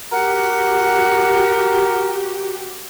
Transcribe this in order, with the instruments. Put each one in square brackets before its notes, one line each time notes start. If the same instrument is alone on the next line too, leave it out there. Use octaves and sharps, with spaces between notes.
[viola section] F#4 G4 [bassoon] A#4 [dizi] F#5